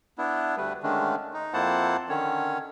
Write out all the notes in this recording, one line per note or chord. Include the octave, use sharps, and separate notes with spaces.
B3 D4 E4
D2 G3 A3 B4
D3 D#3 G#3 A3 C#4 D4
D#4
F2 A#3 E4 C5 F#5 A5
D3 D#3 C#4 C#5